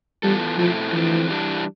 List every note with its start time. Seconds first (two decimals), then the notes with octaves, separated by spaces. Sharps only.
0.23 E3 G3 B3 F4 A4
0.58 B2 F3 A3 C4 E4 A4
0.93 F2 D3 E3 F3 A3 C4
1.28 E3 G3 D4